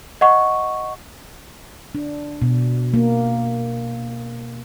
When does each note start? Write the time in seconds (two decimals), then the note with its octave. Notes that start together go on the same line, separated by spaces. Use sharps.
0.21 D#5 F#5 C#6
1.95 D4
2.42 B2
2.94 A#3